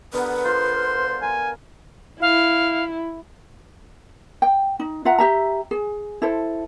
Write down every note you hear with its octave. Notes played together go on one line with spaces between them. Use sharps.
D3 B3 A#4 B4
F4 C5
A#4 G#5
E4 F5
G5
D#4
F4 E5 F#5 A#5
G4 E5 A#5
G#4
E4 A4 C5